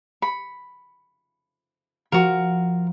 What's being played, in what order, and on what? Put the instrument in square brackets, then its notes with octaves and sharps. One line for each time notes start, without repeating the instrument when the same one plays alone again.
[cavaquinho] B5 [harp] C#7
[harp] F3 [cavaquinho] F#4 A#4